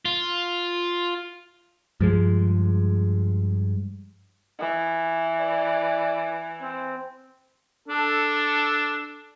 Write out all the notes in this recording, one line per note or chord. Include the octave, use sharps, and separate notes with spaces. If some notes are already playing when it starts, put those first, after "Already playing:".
F4
G2 F3 G#3
E3
B4 D5
C4
D4 A4